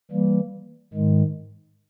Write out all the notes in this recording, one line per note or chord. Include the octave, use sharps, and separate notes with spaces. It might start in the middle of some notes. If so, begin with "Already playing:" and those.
E3 G3 A#3
G#2 D#3 G#3